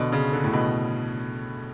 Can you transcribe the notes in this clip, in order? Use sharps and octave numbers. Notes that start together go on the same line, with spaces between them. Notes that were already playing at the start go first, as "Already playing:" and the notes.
Already playing: B2 D3
C#3
D3
A2
B2